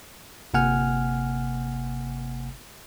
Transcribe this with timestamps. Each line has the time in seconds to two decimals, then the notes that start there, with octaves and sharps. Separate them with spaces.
0.54 G1 C3 A#3 F#5 G#5 F6